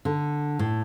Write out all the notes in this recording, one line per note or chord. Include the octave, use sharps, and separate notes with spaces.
D3
A2